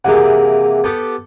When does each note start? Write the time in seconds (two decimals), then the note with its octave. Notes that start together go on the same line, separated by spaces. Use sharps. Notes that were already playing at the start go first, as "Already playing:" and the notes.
0.05 C3 E3 A#3 G#4 F#5
0.84 B3 G4 A4